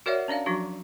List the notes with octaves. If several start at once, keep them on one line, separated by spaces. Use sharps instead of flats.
F#4 A#4 C#5 D5 E5 F#5
C#4 D4 D5 F5
F3 F#3 D4 F#4